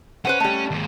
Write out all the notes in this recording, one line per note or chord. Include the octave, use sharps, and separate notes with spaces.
C#4 B4 C5 F#5
G3 A3
D#2 G#2